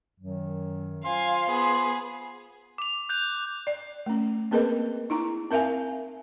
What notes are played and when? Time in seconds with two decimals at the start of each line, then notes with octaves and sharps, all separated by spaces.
0.19 F#2 D#3 F#3
1.04 F4 C5 F5 G#5 C6
1.50 B3 G#4
2.78 D6 F7
3.09 F#6 G6 F7
3.67 D5
4.06 A3 C#4
4.51 A#3 C4 G#4 A#4 B4 D#5
5.10 D#4 E4 A#5
5.51 C4 A#4 E5 F5 G#5